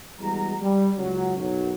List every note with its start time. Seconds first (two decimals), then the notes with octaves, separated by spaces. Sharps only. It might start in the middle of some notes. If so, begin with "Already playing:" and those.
0.21 E2 G3 G#3 F#4 A#5
0.62 G3
0.98 C#2 F#3
1.36 B1 F#2 F#3